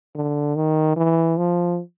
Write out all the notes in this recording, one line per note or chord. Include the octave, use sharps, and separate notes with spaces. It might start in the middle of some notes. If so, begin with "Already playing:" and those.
D3
D#3
E3
F3